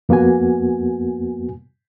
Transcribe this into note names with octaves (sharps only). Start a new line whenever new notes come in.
F2 A#3 B3 F#4 G#5